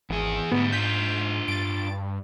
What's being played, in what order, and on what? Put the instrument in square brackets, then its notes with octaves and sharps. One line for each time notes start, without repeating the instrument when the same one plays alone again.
[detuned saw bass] G#1 [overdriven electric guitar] E2 G#4
[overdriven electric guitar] D2 G3 [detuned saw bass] G#2 [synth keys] B3
[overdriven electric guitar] D4 F4 [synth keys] G6 B6
[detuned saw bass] G2 [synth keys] A6 D7